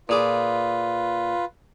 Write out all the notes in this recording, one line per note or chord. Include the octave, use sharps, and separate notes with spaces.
A#2 F4 G#4 B4 D6